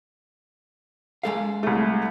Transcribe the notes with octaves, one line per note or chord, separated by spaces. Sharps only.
G#3 A4 F5
C2 A3